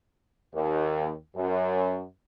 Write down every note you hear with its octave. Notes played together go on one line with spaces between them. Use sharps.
D#2
F#2